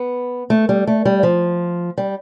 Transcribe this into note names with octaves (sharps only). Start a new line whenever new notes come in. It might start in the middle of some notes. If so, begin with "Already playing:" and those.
Already playing: B3
A3
G3
A3
G3
F3
G3